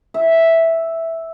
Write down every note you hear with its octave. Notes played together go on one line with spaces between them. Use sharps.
E5